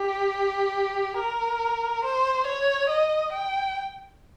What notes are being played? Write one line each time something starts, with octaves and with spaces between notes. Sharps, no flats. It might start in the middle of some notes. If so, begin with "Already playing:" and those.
Already playing: G4
A#4
C5
C#5
D#5
G5